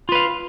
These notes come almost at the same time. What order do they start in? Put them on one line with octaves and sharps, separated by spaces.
F4 B4 F5